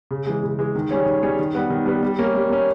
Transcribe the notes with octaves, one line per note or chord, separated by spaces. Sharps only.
C#3
E3 G#3
C#3
E3 G#3
D#3
G3 C#4 G#4 C#5
D#3
G3 C#4 G#4 C#5
D#3
G3 B3
D#3
G3 B3
G3
A#3 C#4
G3
A#3 C#4